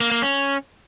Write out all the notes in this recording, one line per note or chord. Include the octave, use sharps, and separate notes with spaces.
A#3
A#3
C#4